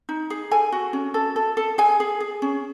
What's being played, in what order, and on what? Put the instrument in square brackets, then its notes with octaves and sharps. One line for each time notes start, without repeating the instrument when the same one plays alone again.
[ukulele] D#4
G#4
A4 G#5
F#4
C#4
A4
A4
A4
G#4 G#5
G#4
G#4
C#4